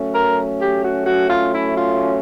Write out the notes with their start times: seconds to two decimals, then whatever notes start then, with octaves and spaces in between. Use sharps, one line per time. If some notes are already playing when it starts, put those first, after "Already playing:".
Already playing: F#3 A3 C#4
0.14 A#4
0.60 G4
0.83 F#4
1.06 F#4
1.30 F4
1.52 E4
1.76 F4